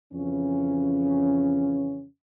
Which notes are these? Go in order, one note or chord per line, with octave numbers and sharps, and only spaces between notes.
F2 C#3 E3 C#4